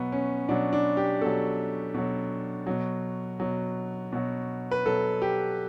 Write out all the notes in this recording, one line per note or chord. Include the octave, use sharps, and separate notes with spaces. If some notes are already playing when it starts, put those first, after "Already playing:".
Already playing: B2 F#3 B3
C#4
B2 F#3 D4
D4
G4
B2 F#3 A4
B2 F#3
B2 F#3
B2 F#3
B2 F#3
B4
B2 F#3 A4
G4